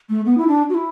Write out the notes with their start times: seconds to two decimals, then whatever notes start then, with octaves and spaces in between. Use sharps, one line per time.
0.09 A3
0.26 B3
0.38 E4
0.48 D4
0.69 F#4
0.74 E4